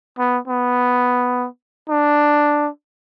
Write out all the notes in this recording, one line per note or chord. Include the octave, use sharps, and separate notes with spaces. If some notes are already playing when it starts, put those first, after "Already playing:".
B3
B3
D4